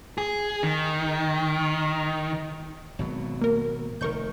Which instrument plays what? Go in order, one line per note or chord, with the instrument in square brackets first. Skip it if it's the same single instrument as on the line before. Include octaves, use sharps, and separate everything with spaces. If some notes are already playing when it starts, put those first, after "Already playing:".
[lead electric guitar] G#4
D#3
[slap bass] G#1 B2 F#3
[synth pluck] A#3 A#4
[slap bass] F1 D#3 [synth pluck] A#4 C#6 G6